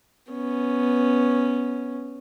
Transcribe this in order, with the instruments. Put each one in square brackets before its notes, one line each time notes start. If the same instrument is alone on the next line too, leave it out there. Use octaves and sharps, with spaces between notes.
[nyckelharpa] B3 C#4